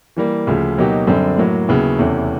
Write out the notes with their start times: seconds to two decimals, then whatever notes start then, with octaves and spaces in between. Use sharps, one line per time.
0.17 E3 G3 A#3
0.47 D2 C#3 F3
0.78 B2 F#3 A#3 D#4 G4
1.07 F#2 D3 G3 C4
1.37 A2 F#3 A#3
1.68 D#2 C#3 F#3 B3 E4
1.98 E2 C3 E3 A3 C#4